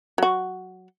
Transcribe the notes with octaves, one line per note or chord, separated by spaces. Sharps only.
F#3 F#4